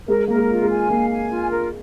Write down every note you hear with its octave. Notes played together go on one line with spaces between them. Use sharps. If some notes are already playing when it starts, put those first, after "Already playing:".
G#3 A#4
A#3 A#4
G#3
F4
G#3
G#5
A#3 F5
G#5
F4
A#4